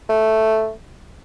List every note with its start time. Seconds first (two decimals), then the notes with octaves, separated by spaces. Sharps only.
0.09 A3